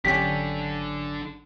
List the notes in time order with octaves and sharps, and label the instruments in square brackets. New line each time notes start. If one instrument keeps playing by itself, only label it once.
[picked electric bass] G#1 D3 F#3 [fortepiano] C#4 G4 [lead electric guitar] D4 A4 [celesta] B6